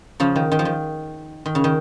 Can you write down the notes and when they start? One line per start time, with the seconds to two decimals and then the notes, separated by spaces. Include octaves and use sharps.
0.20 C#3 F3
0.36 D#3
0.52 D#3
0.59 F3
0.65 D#3
1.46 D#3
1.55 C#3
1.64 D#3